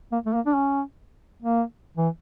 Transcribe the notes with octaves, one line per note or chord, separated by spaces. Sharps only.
A#3
A3
A#3
D4
C#4
A#3
E3